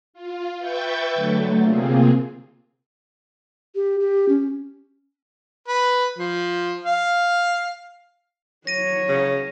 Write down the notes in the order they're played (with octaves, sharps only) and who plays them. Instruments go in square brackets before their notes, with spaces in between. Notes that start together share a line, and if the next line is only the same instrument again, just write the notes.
[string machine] F4
B4 E5 G5 C#6 G6 A6
D3 F#3 A3
C3 A#3 C4 F4 G#4
[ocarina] G4
G4
C#4
[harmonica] B4
F3
F5
[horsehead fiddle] F#3 C#5 [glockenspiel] A#6 D#7
[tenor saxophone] C#3